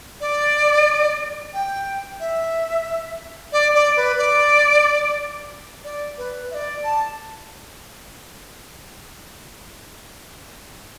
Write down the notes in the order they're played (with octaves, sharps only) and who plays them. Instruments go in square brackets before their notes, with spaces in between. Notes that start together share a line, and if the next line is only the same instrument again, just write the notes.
[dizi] D5
G5
E5
D5
D5
B4
D5
D5
B4
E5
D5
A5